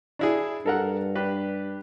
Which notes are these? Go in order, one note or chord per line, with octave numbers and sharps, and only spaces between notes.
D4 E4 G#4
G2 A4 A#4 F#5
D4 G4 B4